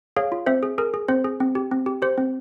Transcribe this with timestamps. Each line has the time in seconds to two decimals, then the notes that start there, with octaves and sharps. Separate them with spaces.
0.16 G#4 C#5 F5
0.32 F4
0.46 C4 C5 E5
0.63 G#4
0.78 G#4 A#4
0.94 G#4
1.08 C4 C5
1.25 G#4
1.40 C4
1.55 G4
1.71 C4
1.86 G4
2.02 G4 C5
2.18 C4